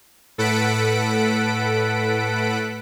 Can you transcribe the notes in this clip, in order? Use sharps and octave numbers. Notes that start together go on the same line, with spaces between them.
A2 A4 B4 F#5 B6 D7